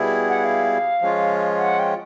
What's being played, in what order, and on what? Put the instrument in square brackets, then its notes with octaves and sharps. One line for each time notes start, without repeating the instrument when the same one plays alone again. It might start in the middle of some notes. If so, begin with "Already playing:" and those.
Already playing: [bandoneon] B2 G3 B3 E4 G#4
[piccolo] F#5
F5
[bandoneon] F3 G#3 C#4 F4
[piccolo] F#5
G5